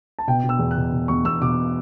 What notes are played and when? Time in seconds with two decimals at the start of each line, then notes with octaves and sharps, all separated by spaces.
0.19 A5
0.27 B2 G5
0.44 B2
0.49 E6
0.59 E2
0.71 F#6
0.76 B2
0.92 B2
1.08 E2 C#6
1.25 E2 E6
1.41 B2 D6